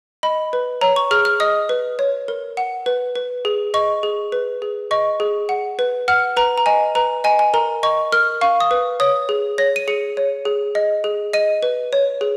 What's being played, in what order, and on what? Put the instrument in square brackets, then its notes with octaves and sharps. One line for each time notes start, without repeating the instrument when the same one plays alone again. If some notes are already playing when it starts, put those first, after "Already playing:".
[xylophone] D#5 B5
B4
C#5 A#5
C#6
G#4 F6
F6
D#5 D#6
B4
C#5
A#4
F#5
B4
B4
G#4
D#5 C#6
G#4
B4
G#4
D#5 C#6
G#4
F#5
B4
F#5 F6
B4 A#5
A#5
D#5 G#5
B4 A#5
D#5 G#5
G#5
A#4 A#5
D#5 C#6
A#4 F6
F5 C#6
D#6
B4
C#5 D#6
G#4
C#5 A#6
D#7
G#4 C#7
C#5
G#4
D#5
G#4
D#5 D#7
B4
C#5
G#4